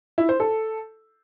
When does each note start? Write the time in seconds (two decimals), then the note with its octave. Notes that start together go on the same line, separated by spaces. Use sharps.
0.18 E4
0.29 C5
0.40 A4